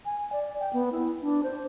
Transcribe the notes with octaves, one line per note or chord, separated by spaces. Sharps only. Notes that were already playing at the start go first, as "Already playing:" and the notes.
G#5
D5
G5
B3
E4
D4
C5